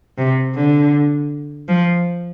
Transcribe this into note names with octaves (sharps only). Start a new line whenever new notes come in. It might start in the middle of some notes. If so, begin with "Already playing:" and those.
C3
D3
F3